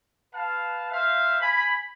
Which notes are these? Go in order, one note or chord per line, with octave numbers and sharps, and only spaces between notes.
B4 F5 A5
C5 E5 F5
G#5 B5